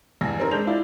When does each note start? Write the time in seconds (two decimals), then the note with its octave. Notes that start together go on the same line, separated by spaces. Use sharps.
0.21 E2 G2 G#5 A#6
0.40 C4 D#4 A#4
0.51 G#3 D4 G6 F7
0.67 E4 F4 D5